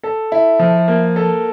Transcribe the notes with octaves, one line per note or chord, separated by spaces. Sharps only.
A4
E4
F3
A#3
A4